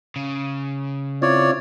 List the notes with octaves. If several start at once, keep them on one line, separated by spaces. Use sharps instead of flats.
C#3
C4 E4 F4 C#5 D5